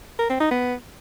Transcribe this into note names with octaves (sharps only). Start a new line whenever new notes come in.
A#4
C4
D#4
B3